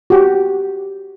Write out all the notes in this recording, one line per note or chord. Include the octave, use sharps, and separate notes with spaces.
F#4 G4